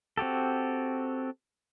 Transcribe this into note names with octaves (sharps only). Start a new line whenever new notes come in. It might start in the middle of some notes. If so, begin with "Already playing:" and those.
C4 F#4 G4 A4